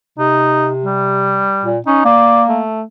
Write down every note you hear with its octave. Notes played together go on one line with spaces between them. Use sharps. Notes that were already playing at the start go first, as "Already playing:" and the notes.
C3 D#4
G3
A#2
C#4 D#4
A#3 D5
A3